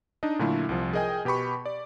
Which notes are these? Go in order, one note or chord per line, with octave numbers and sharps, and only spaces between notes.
D4 D#4 D#5
A#2 D3 F#3 A3 E4 F4
C2 F3
G#4 A#4 D#5 G5 G#5
B2 G4 B4 B5 C#6
D5